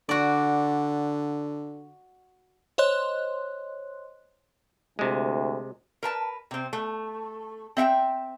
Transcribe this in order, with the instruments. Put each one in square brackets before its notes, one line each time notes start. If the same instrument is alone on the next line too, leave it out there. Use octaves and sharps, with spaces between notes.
[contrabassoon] D3 [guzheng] F#4 D5
[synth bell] C5 C#5 D#5 C6 F#6
[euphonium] D2 [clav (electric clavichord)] C3 G#3
[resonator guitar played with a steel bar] A#4 B4 A5
C3 C4
A3
C4 E5 F#5 G5